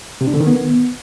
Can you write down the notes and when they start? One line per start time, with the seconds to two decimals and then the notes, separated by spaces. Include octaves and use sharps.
0.21 C3
0.27 D4
0.34 D3
0.40 D#3
0.47 B3